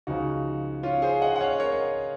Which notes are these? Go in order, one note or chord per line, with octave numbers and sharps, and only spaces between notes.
C#2 C#3 F3 D#4 F#4
C#4 F4
G#4 C5
D#5 F#5
F#5
C#5 F5
D#5
A#4 C#5